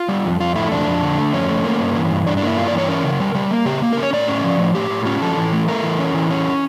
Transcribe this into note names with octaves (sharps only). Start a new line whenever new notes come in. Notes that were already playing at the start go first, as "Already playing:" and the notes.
Already playing: F4
G3
F2
F2 F4
A3 E4
F2 D4
F2
D3
A3
F2 C#4
A3
A#3
G2
E3
G2
G2 D4
D4
A#3 E4
G2 F4
D5
E3
C#5
C#4 A#4
C#3
G3
G3
A#3
C#3 G4
A#3
A#4
C#4
C#5
A2 D5
C#4
F3
A2
A2 G4
A2
C#4 F4
F3 A4
E3
A3
A3 A#4
E3
C#4
E3
C#4